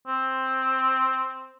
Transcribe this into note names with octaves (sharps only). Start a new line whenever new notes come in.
C4